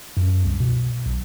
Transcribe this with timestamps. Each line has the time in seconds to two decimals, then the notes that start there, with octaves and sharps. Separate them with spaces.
0.17 F#2
0.45 C2
0.60 B2
1.06 B1